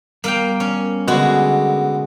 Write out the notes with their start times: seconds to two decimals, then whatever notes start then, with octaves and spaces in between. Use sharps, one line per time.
0.24 G3 A#3 B3 A#4 F5 G5
0.60 C#4
1.08 B2 D3 G#3 F#4